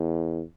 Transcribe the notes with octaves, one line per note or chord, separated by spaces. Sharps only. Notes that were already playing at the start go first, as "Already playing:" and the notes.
Already playing: E2